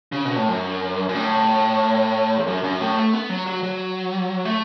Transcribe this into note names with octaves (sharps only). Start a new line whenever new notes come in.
C#3
B2
A2
F#2
F#2
A2
E2
F#2
F#2
A2
A3
B3
F#3
F#3
F#3
A3